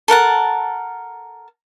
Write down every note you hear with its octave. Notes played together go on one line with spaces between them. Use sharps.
A4 A#4 F#5 A5